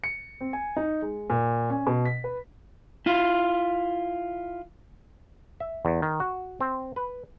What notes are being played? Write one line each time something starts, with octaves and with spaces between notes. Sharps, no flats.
C#7
C4
G#5
D#4
G#3
A#2
C#4
B2
B6
B4
E4 F4
E5
E2
D#3
F#4
C4
B4